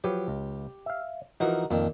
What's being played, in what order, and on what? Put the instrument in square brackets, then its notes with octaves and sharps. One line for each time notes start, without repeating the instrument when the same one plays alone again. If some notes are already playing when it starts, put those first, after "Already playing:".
[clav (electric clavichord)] F3 F#3 B4 [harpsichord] G4
[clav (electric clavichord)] C#2
E5 F5
[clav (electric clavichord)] E3 F3 [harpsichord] D#4 F#4 A#4
[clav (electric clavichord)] F2 [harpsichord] A#2 D#3